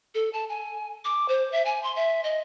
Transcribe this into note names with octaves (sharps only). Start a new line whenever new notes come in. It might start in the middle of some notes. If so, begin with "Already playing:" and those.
A4
A5
G#5
D6
C5
E5
G#5
C6
E5
D#5